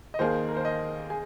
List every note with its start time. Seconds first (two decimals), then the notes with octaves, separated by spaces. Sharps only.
0.14 D#5
0.19 D#2 D#3 A#3 D#4 G#4 C5
0.49 A#4
0.57 C5
0.65 D#5
1.10 G#4 G#5